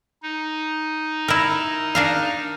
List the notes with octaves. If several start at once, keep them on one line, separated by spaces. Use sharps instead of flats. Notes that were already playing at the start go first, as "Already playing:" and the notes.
D#4
E4 A#4
D4 A#4 F5